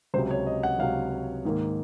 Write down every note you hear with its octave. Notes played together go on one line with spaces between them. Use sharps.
C#2 C3 F#3 C5
C#5
D#5
F#5
C#2 C3 F#3 F5
G#2 D#3 A#3